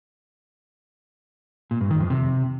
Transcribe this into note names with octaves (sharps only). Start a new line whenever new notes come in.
A#2
G2
D#3
F2
C3